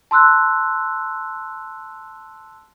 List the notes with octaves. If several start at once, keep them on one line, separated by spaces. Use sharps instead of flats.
A5 C6 E6 F#6